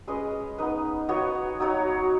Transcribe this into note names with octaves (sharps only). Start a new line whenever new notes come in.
G#3 C#4 B4 D#5
B3 D#4 B4
B3 F#4 C#5
F#3 D#4 F#4 C#5